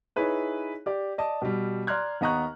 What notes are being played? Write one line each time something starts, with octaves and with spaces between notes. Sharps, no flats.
D#4 E4 G#4 B4 C#5
G4 D5
D5 D#5 A5
B2 G3
D5 A#5 C6 F6 F#6 G#6
D#2 B3 D#5 A#5 C#6 F#6